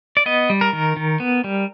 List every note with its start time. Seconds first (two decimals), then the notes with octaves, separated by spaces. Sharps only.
0.17 D5
0.26 B3 D#5
0.50 G3
0.61 A#4
0.73 D#3
0.96 D#3
1.20 B3
1.44 G3